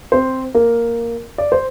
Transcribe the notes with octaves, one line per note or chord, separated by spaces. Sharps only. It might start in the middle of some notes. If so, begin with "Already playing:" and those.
C4 C5
A#3 A#4
D5
C5